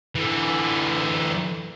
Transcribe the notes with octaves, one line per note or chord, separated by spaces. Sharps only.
D3 E3